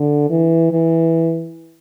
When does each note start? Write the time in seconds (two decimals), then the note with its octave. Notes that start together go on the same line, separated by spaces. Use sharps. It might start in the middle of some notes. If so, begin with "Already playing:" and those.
Already playing: D3
0.30 E3
0.72 E3